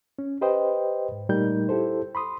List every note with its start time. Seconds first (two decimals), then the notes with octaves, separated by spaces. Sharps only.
0.19 C#4
0.41 G4 B4 C5 D#5 G5
1.12 G#2
1.29 A#2 G3 A3 D#4 A#4 G6
1.69 E4 G4 A4 C5
2.15 B5 C6 D#6